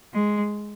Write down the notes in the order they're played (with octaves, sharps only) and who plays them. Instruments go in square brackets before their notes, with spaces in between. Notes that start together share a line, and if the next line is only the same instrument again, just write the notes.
[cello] G#3